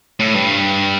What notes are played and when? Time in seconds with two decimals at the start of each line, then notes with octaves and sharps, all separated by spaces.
0.20 A2
0.34 G2